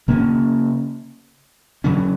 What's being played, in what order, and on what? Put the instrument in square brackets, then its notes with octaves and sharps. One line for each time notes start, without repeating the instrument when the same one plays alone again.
[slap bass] C#3 A#3 C#4
C#3 F#3 C#4